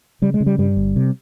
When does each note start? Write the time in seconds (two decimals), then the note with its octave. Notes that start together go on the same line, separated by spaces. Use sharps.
0.22 C#3 G3
0.34 G#3
0.40 C#3
0.46 G3
0.58 G2 G3
0.77 G1
0.96 C3